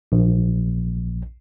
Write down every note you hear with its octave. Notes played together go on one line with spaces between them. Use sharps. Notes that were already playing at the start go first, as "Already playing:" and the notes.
A#1